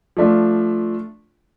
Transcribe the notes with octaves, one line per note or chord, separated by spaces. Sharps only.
F3 A3 D4 F4